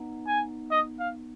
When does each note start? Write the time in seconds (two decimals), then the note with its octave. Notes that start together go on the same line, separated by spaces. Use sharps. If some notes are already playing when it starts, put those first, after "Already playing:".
Already playing: B3 D#4
0.27 G#5
0.71 D#5
0.99 F5